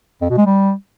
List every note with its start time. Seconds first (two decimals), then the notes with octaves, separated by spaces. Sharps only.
0.21 F2
0.30 B2
0.38 G#3
0.46 G3